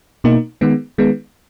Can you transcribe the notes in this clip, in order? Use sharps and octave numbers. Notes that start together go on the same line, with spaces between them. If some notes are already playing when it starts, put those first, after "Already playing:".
B2 A#3 D#4
D#3 G#3 B3
D#3 G#3 B3